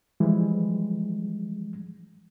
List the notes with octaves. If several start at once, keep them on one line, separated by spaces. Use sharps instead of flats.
E3 F3 G3 G#3